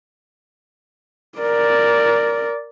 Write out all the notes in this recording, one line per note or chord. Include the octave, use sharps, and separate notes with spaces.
A#4 D5